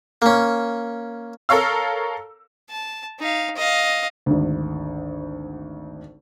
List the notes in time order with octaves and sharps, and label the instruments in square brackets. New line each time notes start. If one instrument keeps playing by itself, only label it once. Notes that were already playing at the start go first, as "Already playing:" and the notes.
[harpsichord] A#3 C#4
[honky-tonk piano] A4 A#4 C#5 F5 E6
[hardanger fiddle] A5
D#4 F5
D#5 F5
[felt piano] G#1 D2